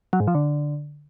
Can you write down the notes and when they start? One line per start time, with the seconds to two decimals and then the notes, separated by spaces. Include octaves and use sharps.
0.13 F#3
0.20 G#2
0.27 F3
0.35 D3